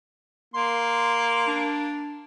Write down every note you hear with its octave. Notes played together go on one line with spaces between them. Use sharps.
A#3 C6
D4